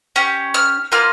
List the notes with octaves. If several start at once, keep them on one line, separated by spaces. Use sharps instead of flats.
C#4 G4
F6
A#3 F4 F6